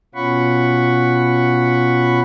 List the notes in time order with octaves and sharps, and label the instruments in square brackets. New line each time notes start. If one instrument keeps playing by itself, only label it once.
[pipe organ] B2 C#4 F4 F#5 B5 C#6